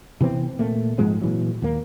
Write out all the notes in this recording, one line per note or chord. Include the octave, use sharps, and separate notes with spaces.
C3 E3 B3 C4
A#2 A3 A#3
G#2 F3 G#3 C4
A#2 E3 F#3
D#2 A#3